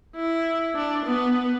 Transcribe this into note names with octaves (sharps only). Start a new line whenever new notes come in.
E4
D4
B3